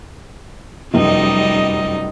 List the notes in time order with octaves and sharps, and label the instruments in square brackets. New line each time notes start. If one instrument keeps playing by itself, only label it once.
[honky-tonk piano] F1 F#2 [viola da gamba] G3 D#4 D#5